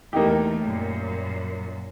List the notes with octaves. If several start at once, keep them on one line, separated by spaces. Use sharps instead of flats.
E2 A3 A#3 D#4 G4
F#2 A#2